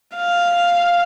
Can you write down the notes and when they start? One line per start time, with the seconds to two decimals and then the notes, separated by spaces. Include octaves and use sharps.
0.16 F5